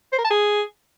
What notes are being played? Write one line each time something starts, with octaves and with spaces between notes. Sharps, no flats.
C5
A#4
A5
G#4